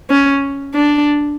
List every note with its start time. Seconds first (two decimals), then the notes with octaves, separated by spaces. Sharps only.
0.10 C#4
0.74 D4